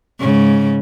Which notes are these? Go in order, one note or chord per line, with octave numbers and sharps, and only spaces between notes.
G#2 C#3